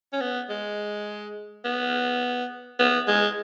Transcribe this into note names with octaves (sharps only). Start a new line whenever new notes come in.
C#4
B3
G#3
B3
B3
G#3